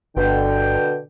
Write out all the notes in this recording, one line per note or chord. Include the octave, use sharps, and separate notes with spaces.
G1 B2 D3 G5